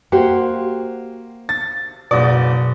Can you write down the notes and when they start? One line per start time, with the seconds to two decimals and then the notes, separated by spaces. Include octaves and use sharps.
0.12 A#3 F#4 G4 C5
1.49 A6
2.11 F#1 B2 F#3 D5